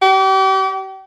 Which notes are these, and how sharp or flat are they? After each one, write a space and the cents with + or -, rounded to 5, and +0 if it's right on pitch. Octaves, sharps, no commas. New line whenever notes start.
G4 -40